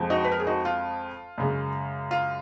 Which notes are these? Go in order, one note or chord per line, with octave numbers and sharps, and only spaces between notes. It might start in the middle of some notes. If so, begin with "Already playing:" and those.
Already playing: F2 F3 G#3
D#4 F#4
B4
A#4
G#4
D#4 F#4
F4
F#2 C#3 G#3
F4